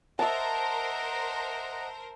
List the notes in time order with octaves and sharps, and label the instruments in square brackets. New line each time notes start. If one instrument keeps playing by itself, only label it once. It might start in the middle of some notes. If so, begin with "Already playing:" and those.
[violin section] A#4 C5 [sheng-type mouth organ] D#5 F#5 A#5 [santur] E5 A5